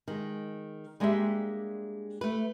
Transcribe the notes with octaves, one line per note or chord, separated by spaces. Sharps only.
D#3 G#3
G3 G#3 A#3 D4 G4 E5
A3 B4